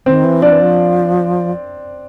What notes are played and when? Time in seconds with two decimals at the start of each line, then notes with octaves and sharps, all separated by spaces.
0.06 D#3 C4
0.24 E3
0.42 F3 D4
0.51 E3
0.60 F3